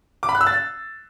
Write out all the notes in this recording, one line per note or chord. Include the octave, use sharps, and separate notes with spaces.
D6
B5
F#6
E6
A6